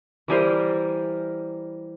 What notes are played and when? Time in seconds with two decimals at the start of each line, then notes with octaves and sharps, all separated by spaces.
0.28 E3 G3 A#4 C5 G#5 D6